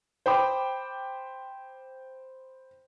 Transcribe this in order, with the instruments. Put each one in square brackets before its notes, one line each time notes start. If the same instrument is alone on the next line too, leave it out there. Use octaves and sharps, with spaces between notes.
[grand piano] C5 G5 B5 D6